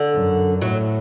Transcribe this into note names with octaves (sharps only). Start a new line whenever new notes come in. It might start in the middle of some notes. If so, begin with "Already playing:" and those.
Already playing: D3
F#2
A2 F#3